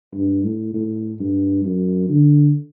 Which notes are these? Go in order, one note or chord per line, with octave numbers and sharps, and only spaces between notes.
G2
A2
A2
G2
F#2
D3